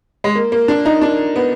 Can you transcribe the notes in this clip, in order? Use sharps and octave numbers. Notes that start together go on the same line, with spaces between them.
G#3
A#3
A#3
D4
D#4
D4
B3